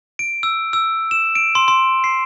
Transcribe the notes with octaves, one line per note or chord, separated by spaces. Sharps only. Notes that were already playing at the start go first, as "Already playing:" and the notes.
D7
E6
E6
E7
D7
C6
C6
C7